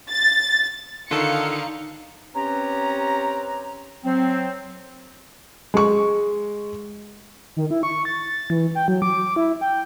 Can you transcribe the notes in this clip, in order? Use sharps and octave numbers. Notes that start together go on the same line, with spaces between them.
A6
D3 D#3 D#4 F4 A4 F5 C#7
C4 C#4 G4 B4 C#5 A#5
F#3 C4
G#3 C#6
D#3
E4
C#6
A6
E3
G5
F#3
D6
E4
G5